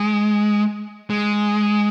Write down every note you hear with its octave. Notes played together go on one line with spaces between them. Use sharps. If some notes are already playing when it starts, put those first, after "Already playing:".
Already playing: G#3
G#3